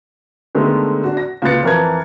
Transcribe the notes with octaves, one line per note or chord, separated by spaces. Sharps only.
D3 D#3 G#3 A3 B3
D4 F#4
A#6
C#2 A#2 F4 B4 A6 C#7
F2 E3 A#4 B4 A5 G#6